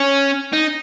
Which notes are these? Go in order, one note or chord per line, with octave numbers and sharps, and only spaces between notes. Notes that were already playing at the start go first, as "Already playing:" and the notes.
Already playing: C#4
D#4